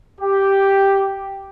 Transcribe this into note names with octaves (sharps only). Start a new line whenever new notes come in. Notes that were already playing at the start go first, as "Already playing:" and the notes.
G4